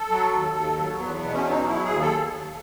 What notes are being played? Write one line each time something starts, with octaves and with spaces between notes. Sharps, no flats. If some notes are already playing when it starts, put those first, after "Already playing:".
Already playing: A4
F#3
D#2
D#2
F#3
E2 B3
B2 B3
C#4
F#3
D#4
F#3 E4
G#4
D#2
A4